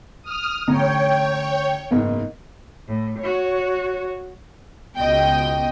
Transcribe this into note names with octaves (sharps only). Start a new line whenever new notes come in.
D#6 F6
A1 D3 C#5 G5 A#5
F#1 E2 G#2
A2
F#4 C#5
C#2 B2 D#5 G5